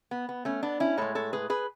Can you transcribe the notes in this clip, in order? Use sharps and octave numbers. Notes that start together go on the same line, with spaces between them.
B3
B3
A3 C#4
B3 D4
C#4 E4
A2 G#3 A4 C#5
A4 C#5
G#4 B4
G#4 B4